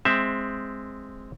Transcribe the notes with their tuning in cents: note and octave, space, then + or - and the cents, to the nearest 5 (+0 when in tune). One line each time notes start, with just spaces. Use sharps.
G#3 -5 C4 +0 E5 +0